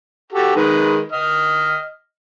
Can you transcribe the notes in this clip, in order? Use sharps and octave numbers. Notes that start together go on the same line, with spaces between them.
F#4 G4 A4
D#3 G#3 B4
D#5 F6